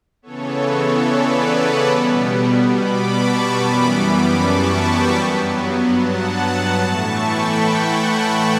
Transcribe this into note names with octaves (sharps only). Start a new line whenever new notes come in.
C#3 E3 B3 A4 C#5
A4 C#5
B4 D5
D5 F#5
B2 G3 B3
B5 D6
A5 C#6
F#2 E3 G3 B3 B5 D6
B5 D6
A5 C#6
G5 B5
G2 F#3 B3
F#5 A5
A2 E3 A3 A5 C#6
G5 B5
F#5 A5